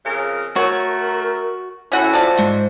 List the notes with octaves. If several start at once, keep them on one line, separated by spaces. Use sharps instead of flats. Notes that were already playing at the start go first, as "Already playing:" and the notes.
F2 C#3 A#4
A3 F#4 A#4 C#5
A2 A3 C#4 E4 F#4 F#5
F4 C5 D5 A5
G#2